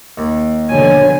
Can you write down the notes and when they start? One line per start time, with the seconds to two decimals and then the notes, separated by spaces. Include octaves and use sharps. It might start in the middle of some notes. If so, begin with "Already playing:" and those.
0.18 D#2
0.69 B2 D3 F3 C#5 G#5